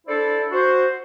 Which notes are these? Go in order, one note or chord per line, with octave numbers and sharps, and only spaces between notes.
D4 E4 A4 C5 D5
F#4 C5